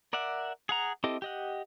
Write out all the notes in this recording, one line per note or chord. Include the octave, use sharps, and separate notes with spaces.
A#4 D5 E5 F#5
G#4 F#5 A#5
C4 E4 G4 A4 D#5
G4 D#5 F#5